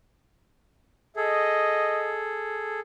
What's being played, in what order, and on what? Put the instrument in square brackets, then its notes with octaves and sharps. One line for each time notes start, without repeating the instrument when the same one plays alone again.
[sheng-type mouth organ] G#4 A4 [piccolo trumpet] D#5